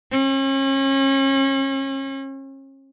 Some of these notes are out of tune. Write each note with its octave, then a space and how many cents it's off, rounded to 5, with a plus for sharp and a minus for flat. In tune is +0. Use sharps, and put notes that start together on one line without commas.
C#4 -35